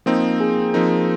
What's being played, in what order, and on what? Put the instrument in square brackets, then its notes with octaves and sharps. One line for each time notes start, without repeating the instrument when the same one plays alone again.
[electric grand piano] F3 C4 D#4 [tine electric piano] A#3
[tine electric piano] G#4
[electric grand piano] F3 C4 D#4 [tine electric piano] A#4